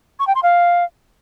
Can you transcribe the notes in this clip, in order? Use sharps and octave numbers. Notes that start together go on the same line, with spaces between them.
C#6
G5
C6
F5